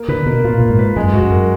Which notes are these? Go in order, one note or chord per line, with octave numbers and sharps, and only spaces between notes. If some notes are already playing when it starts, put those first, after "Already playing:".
Already playing: A#3
D3 B4
B2 A#3
A#2 F4
A#2 A#3
G#2
B4
F#2 G#3
G#2 F#4
F#2
A#4